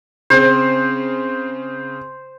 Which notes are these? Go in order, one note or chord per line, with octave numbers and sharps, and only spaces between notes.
C#3 C4 C5